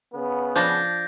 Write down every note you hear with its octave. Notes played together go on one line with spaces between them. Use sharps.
C#3 B3
F3 D4 G6 A6 A#6